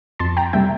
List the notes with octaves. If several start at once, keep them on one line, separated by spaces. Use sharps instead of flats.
F2 A5 C6
G5 A#5
C3 G3 A#3 E5 G5